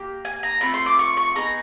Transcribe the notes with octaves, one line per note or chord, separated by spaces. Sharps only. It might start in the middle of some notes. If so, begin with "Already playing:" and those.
Already playing: A#3 G4
G#5
A#5
A3 C4 F4 B5
C6
D6
C#6
C#6
B3 D#4 G#4 A#5